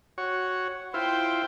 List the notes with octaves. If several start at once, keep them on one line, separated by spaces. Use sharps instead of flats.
F#4 C#5
E4 F4 C5 G5